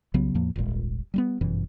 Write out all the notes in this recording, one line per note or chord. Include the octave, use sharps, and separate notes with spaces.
C2 C#3 F#3 B3
E2 A2 F3 A#3
D#1 G#1 A#2 G#3
G3 A3 B3
G1 F#2 B2 E3